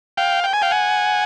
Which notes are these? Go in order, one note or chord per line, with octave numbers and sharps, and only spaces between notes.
F5 G5
G5
G#5
F5 G5
F#5 G#5